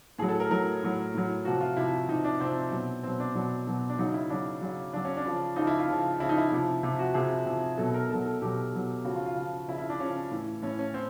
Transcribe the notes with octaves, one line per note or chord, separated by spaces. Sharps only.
A2 F#3 G#4
A4
A#4
A2 F#3 A#4
A2 F#3
A2 F#3
C3 F3 F#4
F4
C3 F3 E4
C3 F3 D#4
D4
C3 F3 C4
B2 F#3
B2 F#3 C4
D4
B2 F#3 D4
B2 F#3
D4
C#3 F#3 D#4
E4
C#3 F#3 D4
C#3 F#3
C#3 F#3 D4
C#4
D4
C#3 F3
C#3 F3 D#4
E4
F4
C#3 F3
C#3 F3 E4
D#4
E4
C3 F3
C3 F3
F#4
C3 F3 G#4
C3 F3
B2 F#3 A4
A#4
B2 F#3 A4
A4
B2 F#3 G4
B2 F#3
C#3 F3 F#4
F4
F4
C#3 F3
C#3 F3 E4
E4
D4
C#3 F3 C#4
A2 E3
A2 E3 C#4
C#4
C4